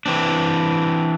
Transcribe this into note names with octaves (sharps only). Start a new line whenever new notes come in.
E3 C4 D4